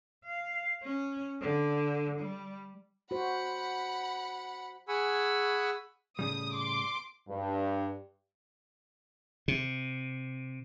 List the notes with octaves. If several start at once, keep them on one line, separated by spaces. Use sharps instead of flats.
F5
C#4
D3
G3
F#4 C5 F#5 B5
G#4 F#5 G#5 B5 C#6 E6
A2 C#3 G3 D#6
C6 D6
G2
C3